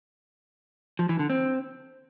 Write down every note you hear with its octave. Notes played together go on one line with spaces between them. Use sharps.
F3
E3
D3
C4